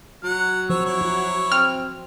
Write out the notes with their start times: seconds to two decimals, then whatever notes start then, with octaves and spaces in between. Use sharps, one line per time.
0.24 F#3 F#5
0.70 F3 C5 C#5 E6
0.86 E4 C#5
1.01 F#4
1.52 C4 F6